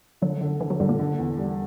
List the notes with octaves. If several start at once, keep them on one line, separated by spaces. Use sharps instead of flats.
D3 F#3
D3
D3 E3
F#3
G2 D3 G3
A#2 A#3
D3
E2
G3